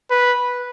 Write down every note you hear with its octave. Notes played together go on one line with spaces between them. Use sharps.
B4